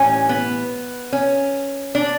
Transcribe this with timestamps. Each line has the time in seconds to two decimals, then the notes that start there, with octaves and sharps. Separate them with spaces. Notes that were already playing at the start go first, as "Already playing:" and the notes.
Already playing: A2 E3 G3 C#4
0.29 B3
1.12 C#4
1.95 D4